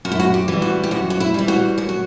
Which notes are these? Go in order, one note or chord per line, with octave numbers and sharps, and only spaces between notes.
F#2 F#4
E4
F#4
G4
E3 G3
F#4
G4
F#2 F#4
F#4
E4
E3 G3
F#4
F#2 F#4
F#4